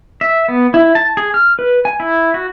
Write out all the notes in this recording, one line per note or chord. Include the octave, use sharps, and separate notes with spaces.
E5
B3
E4
A5
G#4
F6
B4
G#5
E4
F#4